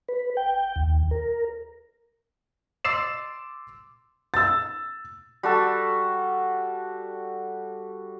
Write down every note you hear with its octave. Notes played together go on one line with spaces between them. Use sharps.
B4
G5
D#2
A#4
C6 D6 E6 A6 C7 E7
E6 A6
G3 F#4 A4